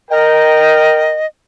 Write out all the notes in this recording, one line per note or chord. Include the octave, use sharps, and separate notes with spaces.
A#4 D#5 G5